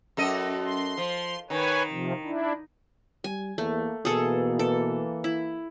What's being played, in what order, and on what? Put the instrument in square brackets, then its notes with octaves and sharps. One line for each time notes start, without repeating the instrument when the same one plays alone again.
[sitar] F#2 A4 D#5
[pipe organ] C6
[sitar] F3
[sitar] D#3 [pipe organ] B4 C#5 G#5
[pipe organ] C3 F3
D4 E4
[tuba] G3 [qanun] G#5
[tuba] E2 [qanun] A3 [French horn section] A#3
[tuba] B2 [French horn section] E3 A#3 [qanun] G#4 A4
[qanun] A4
E4